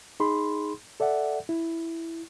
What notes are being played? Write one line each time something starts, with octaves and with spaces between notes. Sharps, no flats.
D#4 G#4 B5 C6
A4 D5 E5 F#5
E4